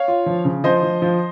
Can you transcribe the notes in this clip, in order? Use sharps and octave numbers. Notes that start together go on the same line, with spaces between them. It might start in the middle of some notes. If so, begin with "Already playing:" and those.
Already playing: C#5 F5
F4
F3
C#3
F3 C5 D#5
F3
F3